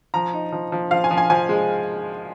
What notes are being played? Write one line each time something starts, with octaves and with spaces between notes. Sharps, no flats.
F3 A#5
D#4
F3
F3
F3 F5
G#5
F3
G#5
F3 G#5
G#3